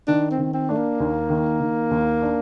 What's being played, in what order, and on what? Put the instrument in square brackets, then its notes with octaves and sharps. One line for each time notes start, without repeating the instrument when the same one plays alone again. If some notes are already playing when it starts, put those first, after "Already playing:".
[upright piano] D#3 [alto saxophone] D4
[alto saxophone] C4
[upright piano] D#3
[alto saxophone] C4
[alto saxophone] A3 [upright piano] D4
[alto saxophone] A#3
[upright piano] D#2
D#3
D#3
D#2
D4